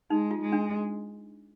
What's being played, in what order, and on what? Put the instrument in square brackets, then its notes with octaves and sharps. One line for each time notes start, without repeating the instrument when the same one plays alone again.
[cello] G#3 [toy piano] D#4
[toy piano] F4
[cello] G#3
[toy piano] D4